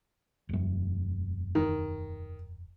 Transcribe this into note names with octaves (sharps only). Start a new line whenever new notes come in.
E1 F#2
D#3